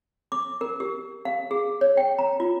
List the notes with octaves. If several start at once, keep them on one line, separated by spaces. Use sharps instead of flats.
D6
A#4
G4
F5
G#4
C#5
G5
A#5
F4